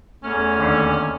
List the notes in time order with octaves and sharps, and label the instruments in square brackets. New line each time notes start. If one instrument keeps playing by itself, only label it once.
[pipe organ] E2 C#5 F6 [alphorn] A3 [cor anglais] C#4
[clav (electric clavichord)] D#2 D3